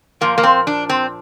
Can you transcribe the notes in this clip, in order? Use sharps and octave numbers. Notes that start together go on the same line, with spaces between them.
A#2 F3 A#3
A#3
C4
D4
C4